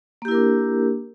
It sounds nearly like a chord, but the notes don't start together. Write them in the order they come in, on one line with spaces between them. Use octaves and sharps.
A#3 G4 E4 A#4 D4